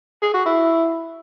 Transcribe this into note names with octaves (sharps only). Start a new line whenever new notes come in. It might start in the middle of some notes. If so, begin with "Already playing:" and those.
G#4
F#4
E4